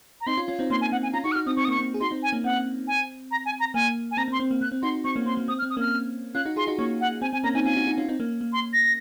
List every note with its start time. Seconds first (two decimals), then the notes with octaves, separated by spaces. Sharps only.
0.21 A#5
0.27 C4 D#4 C6
0.37 C#4 F4
0.48 C#4 F4
0.59 C4 D#4
0.70 A#3 C#4 C6
0.81 G#5
0.92 C4 F#5
1.03 G#5
1.13 C#4 F4 A#5
1.24 D#4 F#4 C#6
1.32 F#6
1.35 D#4 F#4 F6
1.46 C4 D#4 D#6
1.57 C4 C#6
1.65 D#6
1.68 A#3
1.71 C#6
1.78 C4
1.94 G#4
2.01 D#4 F#4 C6
2.11 C4 D#4
2.23 G#5
2.33 A#3 C#4
2.44 C4 F#5
2.88 G#5
3.31 A#5
3.46 G#5
3.60 A#5
3.74 A#3 G#5
4.11 G#5
4.17 C4 A#5
4.28 C4
4.32 C6
4.40 C4
4.51 A#3
4.61 A#3 F#6
4.72 C4
4.82 D#4 F#4 C6
5.04 C4 C#6
5.16 A#3 C#4
5.26 C4 C6
5.37 A#3
5.48 C4 D#6
5.59 F6
5.63 C4
5.70 D#6
5.77 A#3 C#4 F6
6.35 C#4 F4 F#6
6.45 D#4 F#4
6.56 F4 G#4 C6
6.67 D#4 F#4
6.78 A#3 C#4 C#6
7.01 F#5
7.22 C4 G#5
7.33 C4 G#5
7.44 A#3 C#4 A#5
7.54 C4 D#4 G#5
7.65 C#4 F4 G#5
7.76 D#4 F#4
7.87 D#4 F#4
7.97 C#4 F4
8.08 C4 D#4
8.20 A#3 C#4
8.41 A#3
8.53 C6
8.73 A#6